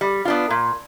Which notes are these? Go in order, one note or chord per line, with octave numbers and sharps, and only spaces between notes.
G3
B3 D4 F4
A#2